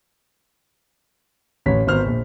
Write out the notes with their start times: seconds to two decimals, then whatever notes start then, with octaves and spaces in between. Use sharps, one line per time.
1.66 A1 C#5 B6
1.87 G#1 B3 A#4 C5 F6
2.06 A#1